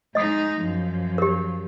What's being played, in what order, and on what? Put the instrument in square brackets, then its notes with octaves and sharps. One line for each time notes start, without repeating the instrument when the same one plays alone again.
[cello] G#3 D#4 [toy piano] D#5 D#6
[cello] F#2 F3
[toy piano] G4 A#4